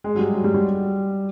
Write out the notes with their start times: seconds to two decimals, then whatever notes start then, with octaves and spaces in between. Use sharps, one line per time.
0.04 G#3
0.15 F#3
0.19 G3
0.33 F#3
0.44 G3
0.54 G3